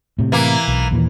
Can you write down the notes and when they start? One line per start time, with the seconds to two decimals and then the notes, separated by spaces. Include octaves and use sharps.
0.19 A2 C3
0.32 E3 A#3
0.68 B1
0.91 D#2 A#2 E3